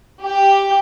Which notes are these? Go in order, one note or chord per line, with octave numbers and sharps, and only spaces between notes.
G4